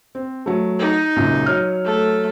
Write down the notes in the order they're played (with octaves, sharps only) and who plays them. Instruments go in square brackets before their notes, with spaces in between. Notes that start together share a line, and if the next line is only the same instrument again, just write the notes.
[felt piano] C4
F#3 A3
[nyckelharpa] D#4
[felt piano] C#2 F#2 A#2
F#3 C#5 F6
[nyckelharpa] A3 A4